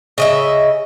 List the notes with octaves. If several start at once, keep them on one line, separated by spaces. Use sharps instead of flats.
C#3 D#5 E5